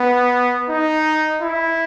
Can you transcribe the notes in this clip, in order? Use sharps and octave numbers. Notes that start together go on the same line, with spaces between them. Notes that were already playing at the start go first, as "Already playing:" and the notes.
Already playing: B3
D#4
E4